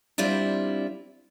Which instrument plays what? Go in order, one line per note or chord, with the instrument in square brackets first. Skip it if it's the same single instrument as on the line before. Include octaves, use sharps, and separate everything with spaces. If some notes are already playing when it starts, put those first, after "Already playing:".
[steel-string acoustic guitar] G3 C4 D4 E4 F4